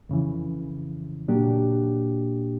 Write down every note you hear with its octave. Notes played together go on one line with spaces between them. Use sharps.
F2 C#3 E3
A#2 F#3 A#3 D4 G4